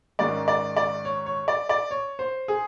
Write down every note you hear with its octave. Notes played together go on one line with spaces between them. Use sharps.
G#2 D#3 G#3 C#4 D5
D5
D5
C#5
C#5
D5
D5
C#5
C5
G#4